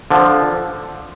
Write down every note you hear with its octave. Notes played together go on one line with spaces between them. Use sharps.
D3 F3